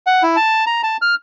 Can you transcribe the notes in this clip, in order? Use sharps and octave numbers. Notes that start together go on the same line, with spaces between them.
F#5
E4
A5
A#5
A5
F6